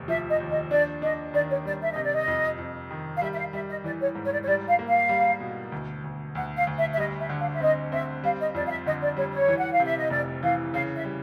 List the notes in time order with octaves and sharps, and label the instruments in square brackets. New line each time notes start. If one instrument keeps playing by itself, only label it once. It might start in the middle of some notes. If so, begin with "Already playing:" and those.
Already playing: [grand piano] F1 D#2
[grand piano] F3 [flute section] E5
[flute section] D#5
[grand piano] D#2
[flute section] D#5
[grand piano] D4 [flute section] D5
[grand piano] D4 [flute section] D#5
[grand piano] D#3 [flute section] D5
[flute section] C#5
[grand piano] G3 [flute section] D5
[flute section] E5
[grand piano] C3 [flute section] D#5
[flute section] D5
D#5
[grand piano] F2
F2
D#3
[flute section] F5
[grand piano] G3 [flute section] E5
[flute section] E5
F5
[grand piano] G3 [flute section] E5
[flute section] D#5
[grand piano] E3 [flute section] D5
[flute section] C#5
[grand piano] G#2
[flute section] C#5
D5
C#5
[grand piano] G3 [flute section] D5
[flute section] F5
[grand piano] A#3
[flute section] F5
[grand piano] G3
B2
D2
D2
[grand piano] D2 [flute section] F#5
[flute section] F5
[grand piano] D2
[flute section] E5
E5
[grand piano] G3 [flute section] D#5
[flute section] E5
[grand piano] D3
[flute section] F5
E5
[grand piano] C4 [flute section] D#5
[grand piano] C4 [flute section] E5
[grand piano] G3 [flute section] F5
[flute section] D#5
[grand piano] F2 [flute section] D5
[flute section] F5
E5
[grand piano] D3 [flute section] D#5
[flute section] D5
[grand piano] G3 [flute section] C#5
[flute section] C#5
[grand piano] E3
[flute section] F#5
F5
[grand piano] C3 [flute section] E5
[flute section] D#5
[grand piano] F1 [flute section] D5
[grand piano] E3 [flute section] F5
[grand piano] C#3 [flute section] F5
[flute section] E5
[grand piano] G3